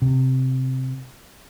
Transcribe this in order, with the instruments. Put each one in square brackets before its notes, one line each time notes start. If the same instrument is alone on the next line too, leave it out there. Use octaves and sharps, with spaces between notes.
[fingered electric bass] C3